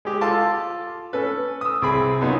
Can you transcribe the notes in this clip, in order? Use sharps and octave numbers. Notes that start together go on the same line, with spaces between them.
G#3 G4
F4 A4 F5 A5 D6
C#4 A4 B4
D#6 E6
C2 C4 G#4 B5
F#2 B3 D#4 F4